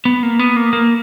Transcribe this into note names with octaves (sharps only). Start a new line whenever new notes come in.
B3
A#3
B3
A#3
A#3